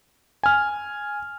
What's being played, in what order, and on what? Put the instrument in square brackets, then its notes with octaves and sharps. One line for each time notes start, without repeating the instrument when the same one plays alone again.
[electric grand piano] G#5 F6